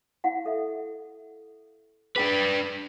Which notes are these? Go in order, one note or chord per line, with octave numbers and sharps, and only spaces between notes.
E4 F5 F#5
A4 E5
D4 G#4 B4 G5